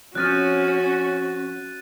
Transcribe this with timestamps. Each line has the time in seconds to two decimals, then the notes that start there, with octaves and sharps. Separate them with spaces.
0.15 F3 C4 C#4 F#4 F#6 A6 D#7